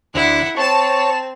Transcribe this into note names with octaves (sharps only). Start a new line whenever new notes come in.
D2 E4 F#5
C4 C#5 A5 E7